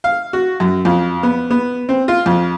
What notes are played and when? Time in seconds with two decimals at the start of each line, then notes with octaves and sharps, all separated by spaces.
0.04 F5
0.33 F#4
0.60 F#2
0.85 F2
1.23 B3
1.51 B3
1.89 C4
2.08 F4
2.26 F2